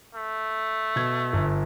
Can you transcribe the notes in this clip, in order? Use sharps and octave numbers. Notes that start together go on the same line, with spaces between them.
A3
B2 G#6
G1